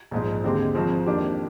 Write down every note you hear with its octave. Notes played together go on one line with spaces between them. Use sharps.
A#1 G#2 F3 G#3
D#2 D3 G#3 C4 G4
G#1 G#2 F3 C4
F2 D#3 A#3 D4 G4